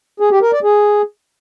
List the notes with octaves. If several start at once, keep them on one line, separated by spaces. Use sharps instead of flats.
G#4
G4
A#4
D5
G#4